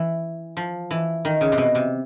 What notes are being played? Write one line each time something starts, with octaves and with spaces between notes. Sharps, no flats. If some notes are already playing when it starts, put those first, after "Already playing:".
Already playing: E3
F3
E3
D#3
C#3
C3
B2
C3